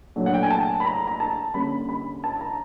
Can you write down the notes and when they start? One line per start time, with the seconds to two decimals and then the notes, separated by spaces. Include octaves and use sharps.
0.16 A#2 F#3 A3 D4
0.26 F#5
0.34 G5
0.43 G#5
0.51 A5
0.80 B5
0.85 A#5
1.07 A#5
1.20 A5
1.54 D3 G3 A#3 C#4 B5
1.89 B5
2.24 A5
2.41 A#5